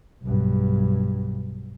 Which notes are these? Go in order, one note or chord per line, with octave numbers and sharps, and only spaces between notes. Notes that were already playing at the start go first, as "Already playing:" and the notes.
B1 G2